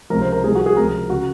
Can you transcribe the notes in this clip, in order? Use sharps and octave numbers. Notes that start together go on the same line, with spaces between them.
C#2 C3 F3 A#4
C5
A#4
C2 C3 F3 G#4
F#4
G#4
C#2 C3 F3 A#4
C#3 F#4